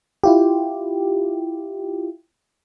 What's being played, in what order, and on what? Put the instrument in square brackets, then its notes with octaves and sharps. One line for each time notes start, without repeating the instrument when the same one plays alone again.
[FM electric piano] E4 F4 G4